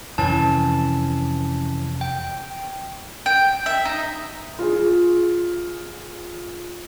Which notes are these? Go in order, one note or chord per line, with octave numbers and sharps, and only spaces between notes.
F2 C3 E3 C#4 A5
G5
G5
E5
D#4
F4 G#4